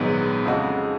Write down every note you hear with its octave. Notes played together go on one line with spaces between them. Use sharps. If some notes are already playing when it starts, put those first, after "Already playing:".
Already playing: A#1 G#2 D#3 F#3 B3
F2 C#3 G#3 D#4 F#4